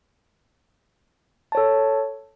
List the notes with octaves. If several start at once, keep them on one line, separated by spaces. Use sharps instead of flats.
A4 C#5 A5